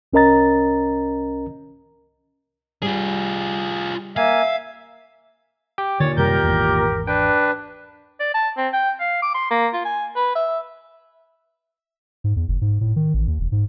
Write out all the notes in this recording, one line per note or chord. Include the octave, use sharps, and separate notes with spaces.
C2 C#4 A#4 D#5 A#5 A6
G3 F4 G#4
A#3 E5 F5 G#5
G4 G5 D6
D#2 A#2 D3 C#5 A6
F#2 C3 G3 G4 A#4 G6
G#1 E2
D4 B4 G5
D5
A5
C4
G5
F5
D6
C6
A#3
F4
G#5
B4
E5
G#2
E2
F#1
G#2
A2
D#3
A1
D#2
E1
G#2